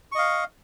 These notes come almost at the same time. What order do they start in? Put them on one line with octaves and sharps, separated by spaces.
C#6 D#5 F5